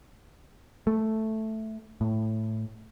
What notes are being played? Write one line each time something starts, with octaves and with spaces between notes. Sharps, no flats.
A3
A2